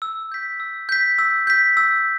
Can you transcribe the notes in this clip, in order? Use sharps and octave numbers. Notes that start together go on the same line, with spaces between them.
E6
G6 B6
E6
G6 B6
E6
G6 B6
E6